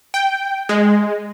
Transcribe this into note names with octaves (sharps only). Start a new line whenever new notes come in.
G5
G#3